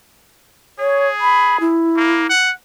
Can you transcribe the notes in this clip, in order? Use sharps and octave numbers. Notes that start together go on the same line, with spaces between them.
G#4 C#5
B5
E4
A#3
F#5